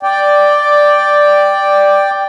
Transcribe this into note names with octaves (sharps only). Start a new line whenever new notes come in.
D5 G5